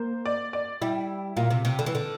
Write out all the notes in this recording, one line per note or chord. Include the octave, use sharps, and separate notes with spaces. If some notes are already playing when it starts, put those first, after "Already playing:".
Already playing: A#3 C5
D5
D5
G3 E4
A#2 F4
C3
C3
D3
E3
D3